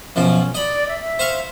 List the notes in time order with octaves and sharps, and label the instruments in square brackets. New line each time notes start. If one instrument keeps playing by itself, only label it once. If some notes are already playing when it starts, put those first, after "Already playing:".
[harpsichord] F#2 B2 F3 [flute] C#4
[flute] D5 [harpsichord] D#5 B5
[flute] E5
E5
[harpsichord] C5 F5 C#6